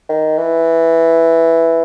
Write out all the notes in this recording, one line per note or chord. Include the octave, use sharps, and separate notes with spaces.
D#3
E3